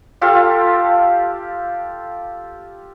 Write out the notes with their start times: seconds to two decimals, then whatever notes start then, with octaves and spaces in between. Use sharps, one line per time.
0.21 F4 G4 A4 F5